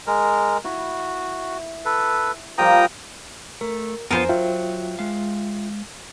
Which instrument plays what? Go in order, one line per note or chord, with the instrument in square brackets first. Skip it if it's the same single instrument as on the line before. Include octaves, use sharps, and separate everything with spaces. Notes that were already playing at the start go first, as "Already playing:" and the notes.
[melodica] G#3 A#4
[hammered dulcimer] E4 [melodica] F#4
[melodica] A4 B4
[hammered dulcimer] F3 G3 A#4 [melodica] G5 A#5 D#6
[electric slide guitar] A3 [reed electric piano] A#4
[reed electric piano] F2 G#5 [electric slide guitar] B3 F4 [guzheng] A#4 C5
[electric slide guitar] F#3 [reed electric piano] F4 E5 G5
[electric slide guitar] G#3 F5